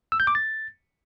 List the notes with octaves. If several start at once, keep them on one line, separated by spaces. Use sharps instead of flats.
E6
G6
D6
A6